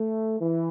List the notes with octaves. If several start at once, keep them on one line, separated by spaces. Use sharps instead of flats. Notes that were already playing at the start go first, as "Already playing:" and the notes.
Already playing: A3
E3